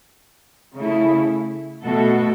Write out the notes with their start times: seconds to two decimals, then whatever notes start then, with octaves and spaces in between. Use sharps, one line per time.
0.75 C#3 A3 E4
1.85 B2 A3 F#4 A4